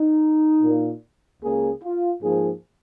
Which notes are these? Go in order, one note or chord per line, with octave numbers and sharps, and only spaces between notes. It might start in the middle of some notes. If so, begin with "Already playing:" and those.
Already playing: D#4
A#2 A#3
C#2 C#3 A#3 G#4
F4
G#2 F3 A#3 G#4